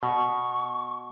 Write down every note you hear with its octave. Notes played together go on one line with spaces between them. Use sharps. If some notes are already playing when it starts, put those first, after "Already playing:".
B2 C#6